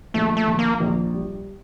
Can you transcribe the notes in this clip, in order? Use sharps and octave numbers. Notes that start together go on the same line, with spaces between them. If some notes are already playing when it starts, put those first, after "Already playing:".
A#1 A3
A3
A#1
A#3
A#1
G3